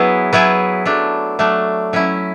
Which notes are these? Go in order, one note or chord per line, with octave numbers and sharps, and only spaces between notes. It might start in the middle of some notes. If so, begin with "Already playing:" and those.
Already playing: F#3 B3 E4 G#4
F#3 B3 E4 G#4
F#3 A3 D4
F#3 A3 D4
F#3 C#4 E4